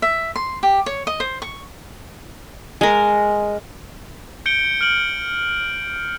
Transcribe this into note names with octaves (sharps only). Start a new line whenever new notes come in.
E5
C6
G4
C#5
D#5
C5
C#6
G#3 A#4
G6 C#7 D7 G7
F6 D7 F#7